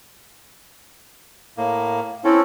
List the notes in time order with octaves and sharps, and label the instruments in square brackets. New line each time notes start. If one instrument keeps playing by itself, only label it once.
[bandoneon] A2 A#3
[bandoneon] C4 C#4 A4 [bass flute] E4